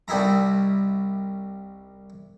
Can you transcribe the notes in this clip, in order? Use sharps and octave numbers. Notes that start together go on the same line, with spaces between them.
C2 G3 D#4 E4 A#5